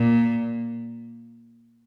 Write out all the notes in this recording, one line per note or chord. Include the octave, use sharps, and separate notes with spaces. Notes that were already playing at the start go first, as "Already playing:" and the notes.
Already playing: A#2